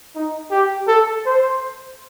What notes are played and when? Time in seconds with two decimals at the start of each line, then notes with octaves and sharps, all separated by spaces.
0.15 D#4
0.51 G4
0.88 A4
1.26 C5